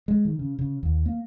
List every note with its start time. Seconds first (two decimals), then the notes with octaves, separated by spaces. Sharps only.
0.08 G#3
0.25 D#3
0.39 C#3
0.59 C#3
0.83 D#2
1.06 A#3